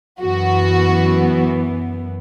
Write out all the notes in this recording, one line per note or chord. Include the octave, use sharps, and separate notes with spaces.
F#2 E3 B3 F#4